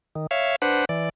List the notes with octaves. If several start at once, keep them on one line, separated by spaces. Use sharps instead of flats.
D#3
C#5 E5 F5
D4 B4 C5 F#5
E3 D5